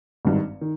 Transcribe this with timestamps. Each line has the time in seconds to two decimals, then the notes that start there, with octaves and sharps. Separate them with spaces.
0.25 G#1 G2 D#3
0.61 D#3